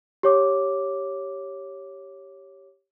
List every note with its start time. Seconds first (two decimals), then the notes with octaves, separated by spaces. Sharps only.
0.23 G4 C#5 D6